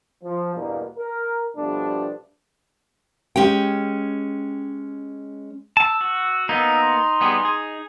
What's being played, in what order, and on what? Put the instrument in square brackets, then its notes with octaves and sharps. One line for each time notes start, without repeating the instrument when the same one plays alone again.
[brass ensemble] F3
E2 G2 B2 A#3
A#4
B2 F3 G3 A3 B3 D4
[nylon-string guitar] G#3 C#4 G4 G5
[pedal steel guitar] A5 [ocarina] E6
[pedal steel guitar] F#4
[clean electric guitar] A#3 B3 [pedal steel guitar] D#4
[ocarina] C6
[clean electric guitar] G3 B3 G#4
G#4